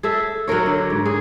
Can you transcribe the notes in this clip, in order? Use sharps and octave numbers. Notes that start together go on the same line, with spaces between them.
G#4 A4 E5
F#3 D#4 A#4 C#5
D3
G#2
G#4